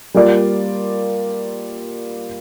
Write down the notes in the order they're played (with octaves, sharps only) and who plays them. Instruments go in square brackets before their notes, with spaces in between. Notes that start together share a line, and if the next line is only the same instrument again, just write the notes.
[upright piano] G3 A#3 F4 A#4 D5